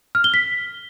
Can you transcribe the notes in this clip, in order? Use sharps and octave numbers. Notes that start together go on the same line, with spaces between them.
F6
G7
B6